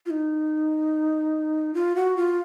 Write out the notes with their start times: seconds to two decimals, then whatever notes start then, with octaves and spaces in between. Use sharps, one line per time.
0.06 F4
0.10 D#4
1.74 F4
1.96 F#4
2.17 F4